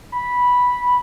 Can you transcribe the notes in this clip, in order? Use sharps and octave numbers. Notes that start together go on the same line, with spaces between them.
B5